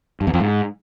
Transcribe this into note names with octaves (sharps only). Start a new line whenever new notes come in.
G2
E2
F2
G#2